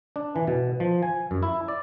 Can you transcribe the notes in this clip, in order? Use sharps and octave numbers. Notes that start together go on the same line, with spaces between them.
D4
E3
B2
F3
G#5
F#2
E4
D5